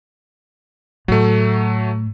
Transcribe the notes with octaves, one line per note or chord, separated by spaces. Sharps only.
A2 F#3 A3